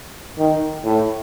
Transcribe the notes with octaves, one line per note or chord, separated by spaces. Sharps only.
D#3
A2